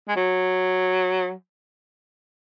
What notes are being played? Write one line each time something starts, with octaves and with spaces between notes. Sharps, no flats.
G#3
F#3